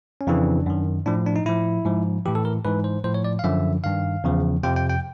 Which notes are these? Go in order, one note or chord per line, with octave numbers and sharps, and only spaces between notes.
C#4
F2 C#3 E3 D4
F#2 D#3
A2 F3 D4
D4
D#4
A2 F3 E4
G#2 F3
A2 E3 G4
A4
A#4
G#2 E3 B4
C5
A2 F3 C5
C#5
D5
F5
F#2 D3 F3 E5
G2 D#3 F5
E2 C#3 F3
F2 C3 F3 G5
G5
G5